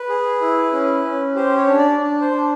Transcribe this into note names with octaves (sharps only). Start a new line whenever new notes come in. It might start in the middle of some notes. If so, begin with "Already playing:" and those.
Already playing: B4
G#4
E4
C#4
C#4
G4 C5
C#5
D4
D5
D4
C5
D4